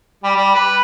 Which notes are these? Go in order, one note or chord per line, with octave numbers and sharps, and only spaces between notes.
G3
G3
B4